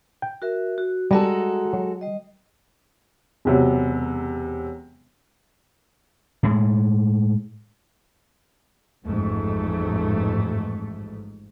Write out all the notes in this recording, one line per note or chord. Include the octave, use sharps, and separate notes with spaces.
G5
F#4 A#4 E5
F#4
G3 G#3 F#4 A4 A#5
F#3
G3 D#5
E1 C3 F#3
A2 G#3
A1 F2 G#2 A3